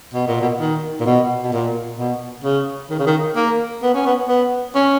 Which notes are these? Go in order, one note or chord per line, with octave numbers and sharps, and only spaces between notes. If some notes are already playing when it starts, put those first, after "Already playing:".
B2
A#2
B2
D#3
A#2
B2
B2
A#2
B2
C#3
D#3
C#3
D#3
A#3
B3
C#4
B3
B3
C#4